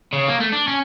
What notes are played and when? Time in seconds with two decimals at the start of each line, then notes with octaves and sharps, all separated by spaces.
0.13 C#3
0.29 A#3
0.41 A3
0.53 D4
0.68 C#4